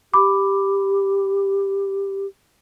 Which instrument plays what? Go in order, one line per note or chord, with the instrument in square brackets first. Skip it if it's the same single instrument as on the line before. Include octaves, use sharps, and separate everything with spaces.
[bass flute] G4 [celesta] B5 D6